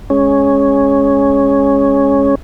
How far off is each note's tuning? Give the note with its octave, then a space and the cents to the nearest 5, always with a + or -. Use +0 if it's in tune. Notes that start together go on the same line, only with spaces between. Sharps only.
G#3 +5 C#4 +0